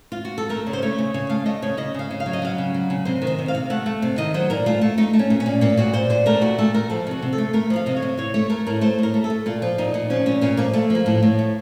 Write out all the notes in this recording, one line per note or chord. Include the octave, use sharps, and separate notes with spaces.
F4
F#4
A4
A3 A#4
C#3
C5
A3 C#5
C#3
C#3 C#5
A3 F5
A3 D#5
C#3 C#5
C#3 D#5
C#3 F5
C#3
F5
F#3
D#5
F#3 F5
C#3
F#3
C#3
C3 C5
D#3
C5
C3
F5
C3
A3 F#5
A3
C3
D#3 D#5
F#3 C5
A#2 A#4
A3 F4
A3
A3 D#4
A3
C#4
A#2
C#4
A#2
A#2 A#3
A#2 F#4
A#2 C5
A#2 C5
A3 A#4
A#2 F#4
A3 A4
A3 A#4
F3 A4
C3 F#4
C3
A4
A3
A3 A#4
F3
F5
C3 D#5
C#5
C3
A2 C#5
A3 C#5
A3 A#4
A2 A#4
A3 C5
A2 A#4
A3
A4
A3
A#2 F4
F3
A#2 D#4
A#2
F3 C#4
A#2 C#4
A#2 C#4
F3 A#3
A3
F3 A#3
A2
A2
A3